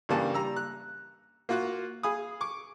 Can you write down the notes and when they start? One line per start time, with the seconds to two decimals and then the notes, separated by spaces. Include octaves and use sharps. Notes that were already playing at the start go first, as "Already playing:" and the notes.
0.09 G2 C#3 E3 G3 A#3 A5
0.34 G3 A#5 E6
0.56 F#6
1.49 A#3 F4 F#4 F5 F#6
2.03 G#4 F5 G#5 B5 D#6
2.41 C#6 D6